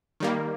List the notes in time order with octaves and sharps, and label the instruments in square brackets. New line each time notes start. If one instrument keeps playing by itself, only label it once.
[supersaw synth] D#3 G3 A#3